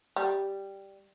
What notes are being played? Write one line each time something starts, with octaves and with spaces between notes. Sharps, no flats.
G3